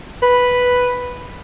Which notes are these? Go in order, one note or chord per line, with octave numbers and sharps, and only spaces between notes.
B4